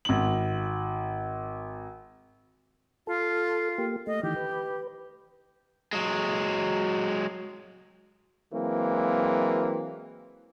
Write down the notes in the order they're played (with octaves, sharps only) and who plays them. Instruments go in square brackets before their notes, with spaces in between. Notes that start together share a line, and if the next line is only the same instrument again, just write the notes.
[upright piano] G#1 F#7
[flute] F4 [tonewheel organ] A4
[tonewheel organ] A#3 G4
[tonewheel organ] A3 [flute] D#5
[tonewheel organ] D#3 E3 [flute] G4
[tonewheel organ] B4
[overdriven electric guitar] F#3 G#3
[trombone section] E3 F#3 G#3 A#3 C4